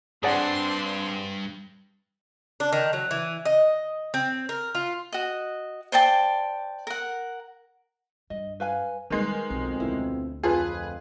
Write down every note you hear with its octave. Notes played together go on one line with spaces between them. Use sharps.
G2 C4 D4 G#4 D5 F#5 C6
D4
D#3
F#3
E3
D#5
C4
A#4
F4
F#4 D#5
C5 D5 G5 A5
A#4 F#5
G2 D#5
B4 F5 G#5
D#3 G3 G#3 D#4 B4
B1 F2 B2 C4
D2 E4
F2 F4 G#4 A4 B4 F5